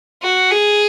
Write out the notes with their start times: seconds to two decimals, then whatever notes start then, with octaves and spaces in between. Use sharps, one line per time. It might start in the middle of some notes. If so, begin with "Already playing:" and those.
0.23 F#4
0.51 G#4